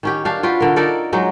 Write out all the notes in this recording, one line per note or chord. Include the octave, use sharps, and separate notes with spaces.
D#3 C#4 G4
D4 G4 F5
F4 F#4 B4 G5
D3 A#4
D#4 A4 A#4 D5
F#3 G#3 D#4